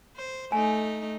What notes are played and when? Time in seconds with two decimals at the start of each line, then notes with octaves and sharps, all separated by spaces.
0.17 C5
0.52 A3 D#4 G#5